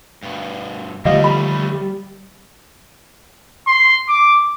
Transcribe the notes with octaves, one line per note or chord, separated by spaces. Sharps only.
G2 B2
D#2 A2 D3 F3 G3 A3 D#5 F5
G3 B5
C6
D6